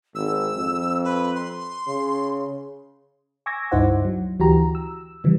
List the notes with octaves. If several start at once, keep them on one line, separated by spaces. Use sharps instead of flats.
G#1 E6
F2
B4
C6
C#3
G#5 C#6 D6 E6 G#6 A#6
C#2 G2 D#4 E4 C5 F#5
F#3
D2 E3 F#4 G4 A#5
E6
C#3 E3 F3 G3